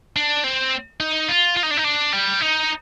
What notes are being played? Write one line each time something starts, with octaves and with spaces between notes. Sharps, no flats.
D4
C4
D#4
F4
F4
D#4
D4
D#4
D4
G3
D#4